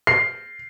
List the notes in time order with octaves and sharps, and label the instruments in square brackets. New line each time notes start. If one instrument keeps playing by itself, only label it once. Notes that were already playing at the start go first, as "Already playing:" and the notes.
[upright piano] C7